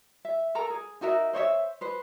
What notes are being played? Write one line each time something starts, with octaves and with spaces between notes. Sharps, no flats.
E5
A4 A#4 A#5
G#4
D#4 F#4 A#4 E5
C5 C#5 D#5 E5
B4 C5